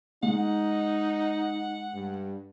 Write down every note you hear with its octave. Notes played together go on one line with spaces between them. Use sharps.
G#3 D#4 F#5
G2